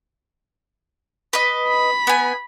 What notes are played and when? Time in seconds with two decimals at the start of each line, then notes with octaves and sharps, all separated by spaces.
1.33 B4 D#5
1.68 B5
2.07 B3 G#5